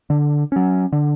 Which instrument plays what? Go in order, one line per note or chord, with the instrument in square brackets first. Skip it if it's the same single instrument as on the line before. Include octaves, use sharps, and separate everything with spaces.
[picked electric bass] D3
F#3 C#4
D3